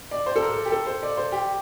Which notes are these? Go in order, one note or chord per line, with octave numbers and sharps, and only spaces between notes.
D5
C5
A4
A#4
G4
A4
C5
D5
C5
G4